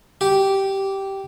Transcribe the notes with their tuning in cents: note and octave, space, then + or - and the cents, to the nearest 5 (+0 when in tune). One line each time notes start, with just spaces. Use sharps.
G4 -10